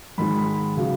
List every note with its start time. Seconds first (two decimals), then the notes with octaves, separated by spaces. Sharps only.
0.18 G#2 D#3 G#3 B5
0.38 B5
0.77 C#3 F#3